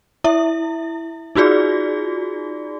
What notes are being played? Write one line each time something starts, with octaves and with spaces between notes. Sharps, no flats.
E4 E5
D#4 F4 F#4 G#4 D5